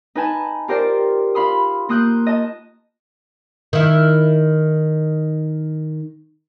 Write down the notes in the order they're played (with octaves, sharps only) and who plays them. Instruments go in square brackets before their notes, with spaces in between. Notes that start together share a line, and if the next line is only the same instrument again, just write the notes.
[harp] D#4 B4 G#5 A5
F4 G4 A#4 C5 D5
F4 F5 B5 C6 D#6
A#3 F4 D#6 F#6 G6
D#5 A5
[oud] D#3 E4